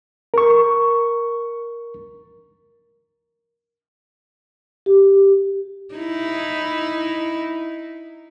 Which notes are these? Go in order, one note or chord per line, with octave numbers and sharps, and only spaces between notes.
A#4 C#6
G4
D#4 E4